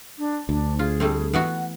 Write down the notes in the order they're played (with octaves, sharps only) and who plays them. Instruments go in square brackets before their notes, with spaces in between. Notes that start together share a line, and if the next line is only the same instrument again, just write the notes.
[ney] D4
[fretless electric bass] D2 [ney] D4
[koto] F4 [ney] G#4
[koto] G3 A3 C4
[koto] E3 B3 F#4 [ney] F#5